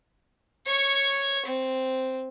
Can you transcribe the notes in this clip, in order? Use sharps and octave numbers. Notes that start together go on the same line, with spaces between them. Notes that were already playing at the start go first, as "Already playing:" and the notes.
C#5 C#6
C4